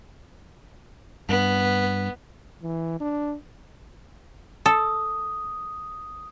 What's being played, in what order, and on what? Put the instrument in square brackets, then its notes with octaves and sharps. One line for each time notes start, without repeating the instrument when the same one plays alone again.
[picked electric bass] G2 [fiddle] B3
[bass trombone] E3
D4
[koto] A4 [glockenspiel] D#6